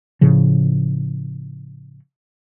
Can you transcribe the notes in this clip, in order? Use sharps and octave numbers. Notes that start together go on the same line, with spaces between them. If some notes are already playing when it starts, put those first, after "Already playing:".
A2 C#3 F3